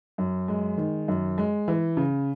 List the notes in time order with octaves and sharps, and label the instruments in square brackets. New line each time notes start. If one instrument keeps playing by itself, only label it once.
[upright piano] F#2
G#3
D#3
F#2
G#3
E3
C#3